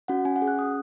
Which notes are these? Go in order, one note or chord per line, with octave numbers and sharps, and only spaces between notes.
C#4 F#4 F#5
C#4 G#5
F#5
G#4
F#6
C#4 D#6